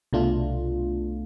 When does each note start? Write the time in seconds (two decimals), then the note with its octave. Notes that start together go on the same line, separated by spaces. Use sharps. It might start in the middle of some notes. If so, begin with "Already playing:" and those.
0.13 C2 B2 A3 D4 F4